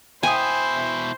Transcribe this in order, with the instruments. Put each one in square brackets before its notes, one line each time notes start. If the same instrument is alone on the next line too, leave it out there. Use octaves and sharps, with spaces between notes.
[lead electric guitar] B2 E4 [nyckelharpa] C5 [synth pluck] G5 D#6 [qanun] G#5